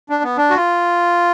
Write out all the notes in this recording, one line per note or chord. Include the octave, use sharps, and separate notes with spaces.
D4
B3
D4
F#4
F4